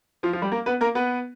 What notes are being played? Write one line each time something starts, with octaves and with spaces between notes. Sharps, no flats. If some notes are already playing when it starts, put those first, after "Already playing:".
F3 F4
F3 F4
G3 G4
A#3 A#4
B3 B4
A#3 A#4
B3 B4